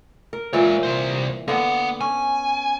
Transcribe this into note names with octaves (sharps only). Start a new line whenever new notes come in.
A#4
A#2 E3 G#3 C#5
C2 C5
D3 A#3 B3 F#5
C#4 G#5